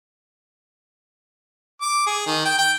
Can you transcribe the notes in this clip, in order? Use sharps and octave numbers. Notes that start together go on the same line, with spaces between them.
D6
G#4
D#3
G5
G5